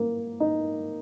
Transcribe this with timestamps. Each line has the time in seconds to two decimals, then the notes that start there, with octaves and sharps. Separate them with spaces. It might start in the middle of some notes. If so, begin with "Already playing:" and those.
Already playing: A#3
0.40 D#4